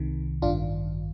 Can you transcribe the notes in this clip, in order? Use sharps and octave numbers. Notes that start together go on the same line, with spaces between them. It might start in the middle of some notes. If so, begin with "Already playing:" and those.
Already playing: C2 C3 D#3
A1 G2 D#3 D4 F4